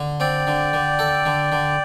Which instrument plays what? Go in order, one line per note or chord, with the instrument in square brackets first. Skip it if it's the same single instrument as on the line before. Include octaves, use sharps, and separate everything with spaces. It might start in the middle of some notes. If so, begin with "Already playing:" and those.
Already playing: [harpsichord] D3
[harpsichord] C4 [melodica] D5 G5
[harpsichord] D3
D3
A4
D3
D3